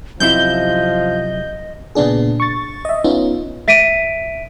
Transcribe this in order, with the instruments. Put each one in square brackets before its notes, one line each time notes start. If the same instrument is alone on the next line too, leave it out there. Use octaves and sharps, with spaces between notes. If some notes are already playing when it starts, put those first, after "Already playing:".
[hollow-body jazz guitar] F#2 C3 E4 [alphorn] F3 [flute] D#5 [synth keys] G6
[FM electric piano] A#2 C#3 B3 D4 G#4
C#6 A6
D#5 E5
B3 C#4 D#4 F4
[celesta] E5 B6 D7 D#7